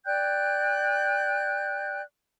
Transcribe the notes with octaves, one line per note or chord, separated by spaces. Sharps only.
D5 G5 F#6 G6